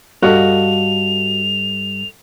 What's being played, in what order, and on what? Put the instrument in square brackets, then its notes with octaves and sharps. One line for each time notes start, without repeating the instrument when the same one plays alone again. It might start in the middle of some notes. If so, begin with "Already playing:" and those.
[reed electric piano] G2 G3 [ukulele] F#4 [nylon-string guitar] A4 D#5 F5 [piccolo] F7